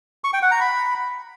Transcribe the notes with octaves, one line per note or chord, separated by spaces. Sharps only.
C#6
G5
F#5
A#5
B5